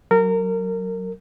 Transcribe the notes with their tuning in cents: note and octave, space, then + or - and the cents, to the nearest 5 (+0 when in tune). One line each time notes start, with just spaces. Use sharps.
F#3 +15 A#4 -25